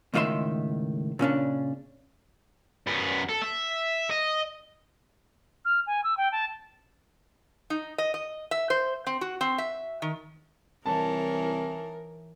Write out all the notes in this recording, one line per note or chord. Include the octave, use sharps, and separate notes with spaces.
C#2 A2 D#3 F4 E5 C6
A#2 C#3 C#4 D4
F#2 B3
A4
E5
D#5
F6
G#5
E6
G5
A5
D#4
D#5
D#5
E5
C5
C4
F#4
C4
E5
D#3
C2 E3 D#4 A#4 C#5 A5